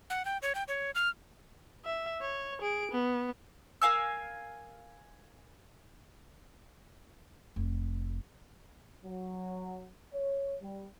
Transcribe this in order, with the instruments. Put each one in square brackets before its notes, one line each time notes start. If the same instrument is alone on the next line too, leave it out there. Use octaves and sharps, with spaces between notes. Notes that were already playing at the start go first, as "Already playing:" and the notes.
[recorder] F#5
G5
C#5
G5
C#5
F6
[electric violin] E5
C#5
G#4 D7
B3
[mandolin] A#4 F5 G#5 E6
[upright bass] F1
[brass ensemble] F#3
C#5
G3